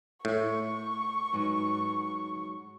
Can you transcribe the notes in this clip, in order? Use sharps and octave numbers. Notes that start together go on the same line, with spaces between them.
A2 C#6
G#2 F#3 B4